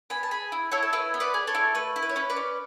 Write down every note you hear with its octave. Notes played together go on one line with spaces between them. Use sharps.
B3 G#5 B5
A5
G#4 G#5 B5
E4
E4 A4 C#5
A4
E4 B4
B3
B4 D5
G#4
A4 C#5
E4
A3 B4
E4
B4
C#5
C#4 B4
B4 D5
C#4